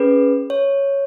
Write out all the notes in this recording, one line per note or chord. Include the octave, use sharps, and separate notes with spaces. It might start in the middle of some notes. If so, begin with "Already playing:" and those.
Already playing: C#4 G#4 B4
C#5